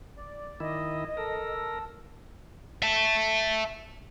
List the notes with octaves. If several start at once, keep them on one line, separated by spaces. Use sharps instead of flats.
D5
D#3 E4 D#5
A4 A#4 E6
E5 A5